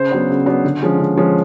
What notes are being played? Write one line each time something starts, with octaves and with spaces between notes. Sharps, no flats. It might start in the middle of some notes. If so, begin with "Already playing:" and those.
Already playing: C#3 C5
F#3 B3 D4
C#3
F#3 B3 D4
D3
F3 G#3 C#4
D3
F3 G#3 C#4